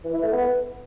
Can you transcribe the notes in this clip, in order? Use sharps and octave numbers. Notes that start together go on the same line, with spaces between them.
E3
E4
A3
B3